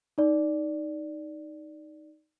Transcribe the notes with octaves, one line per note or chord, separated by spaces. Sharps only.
D#4 D5